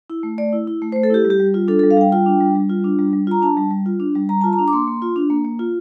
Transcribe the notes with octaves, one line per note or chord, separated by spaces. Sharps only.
E4
A3
A3 D5
E4
E4
A3
C5
A3
A4
E4 G4
G3
G4
G3
F4
D4 A4
A4
G3
F5
G3 G5
F4 G5
D4
G3
G3
F4
D4
G3
G3
F4 A#5
D4 A5
G3
G3
F4
D4
G3
G3 A#5
F4 A5
A#5
D4
D6
A#3 C6
A#3
F4
D4
A#3
A#3
F4